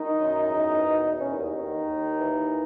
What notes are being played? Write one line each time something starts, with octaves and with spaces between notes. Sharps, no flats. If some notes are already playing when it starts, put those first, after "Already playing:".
Already playing: D#3 D#4
F#2
E2
B2
E2
C#4
D#2 D#4
D#3
D#2
E3